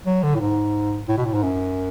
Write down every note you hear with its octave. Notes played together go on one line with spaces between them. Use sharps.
F#3
D3
A2
G#2
A2
B2
A2
G#2
F#2